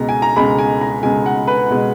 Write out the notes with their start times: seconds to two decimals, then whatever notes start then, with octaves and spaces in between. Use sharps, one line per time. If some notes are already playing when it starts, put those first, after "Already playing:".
Already playing: C#2 B2 G#3 A#5
0.09 G#5
0.22 A#5
0.36 C#2 B2 G#3 B5
0.58 G#5
0.81 A#5
1.03 C#2 B2 G#3 G#5
1.26 F#5
1.47 B4
1.70 B2 G#3